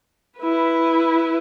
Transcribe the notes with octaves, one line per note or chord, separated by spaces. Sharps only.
E4 B4